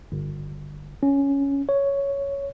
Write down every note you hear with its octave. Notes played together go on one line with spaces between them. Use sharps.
G1
C#4
C#5